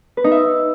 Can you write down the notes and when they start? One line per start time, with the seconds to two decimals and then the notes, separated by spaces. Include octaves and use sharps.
0.17 B4
0.24 D#4
0.32 E5